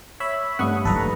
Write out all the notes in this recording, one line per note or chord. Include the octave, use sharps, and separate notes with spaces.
C#5 E5 B5
G2 A3 F#5 B5 C#6 D#6
D#3 A4 B4 A#5